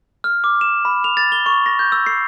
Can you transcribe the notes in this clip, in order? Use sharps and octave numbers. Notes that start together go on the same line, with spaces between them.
F6
D6
E7
B5
F7
A6
G7
C#6
A#6
G6
E6
C7